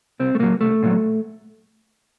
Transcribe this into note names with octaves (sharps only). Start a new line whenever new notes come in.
C2 C4
A3
A#2 F#3 A#3
C2 A3
A#2 F#3